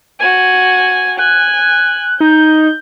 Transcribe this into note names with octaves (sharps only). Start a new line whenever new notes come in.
F#4 G#5
G#5 F#6
D#4 G6